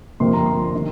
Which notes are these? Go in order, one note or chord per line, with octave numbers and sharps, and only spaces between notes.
G1 F2 C3 F3 A#3 C6
A#5
C6
D#3